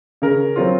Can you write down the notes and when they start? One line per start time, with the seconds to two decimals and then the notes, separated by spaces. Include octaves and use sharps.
0.22 C#3 A#4
0.56 F#3 C4 F4